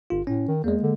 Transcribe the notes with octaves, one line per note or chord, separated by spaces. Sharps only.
G1 F4
A2 C#4
D#3
E2 G#3 A#3
D3